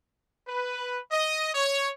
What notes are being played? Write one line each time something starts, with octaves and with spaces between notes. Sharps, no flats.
B4
D#5
C#5